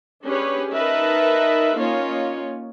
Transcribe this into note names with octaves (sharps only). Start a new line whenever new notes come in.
C#4 D4 G4 G#4 B4 C#5
D#4 A#4 B4 E5 A5
A#3 C#4 D#4 F4 C#5